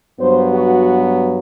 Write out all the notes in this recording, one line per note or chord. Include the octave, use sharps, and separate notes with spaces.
G2 F#3 B3 C5
F#4